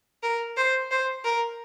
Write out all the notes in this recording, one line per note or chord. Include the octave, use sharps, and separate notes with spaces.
A#4
C5
C5
A#4